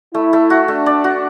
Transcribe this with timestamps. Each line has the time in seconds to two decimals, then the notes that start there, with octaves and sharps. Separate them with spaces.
0.14 A3 E4
0.33 A3
0.50 F#4
0.68 A3 D4
0.86 D5
1.04 F#4